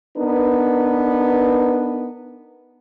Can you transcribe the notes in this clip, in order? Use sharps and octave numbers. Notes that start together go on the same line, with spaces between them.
B3 D4 D#4 A#4 B4